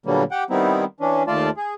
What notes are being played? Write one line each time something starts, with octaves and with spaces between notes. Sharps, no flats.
A#2 D3 F#3 G3 A#3 B3
G4 F#5 G5
D#3 G3 B3 C4 D#4 E4
E3 C#4 D4
D#2 A3 F4 D5 A5
G#4